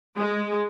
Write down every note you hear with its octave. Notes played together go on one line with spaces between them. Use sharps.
G#3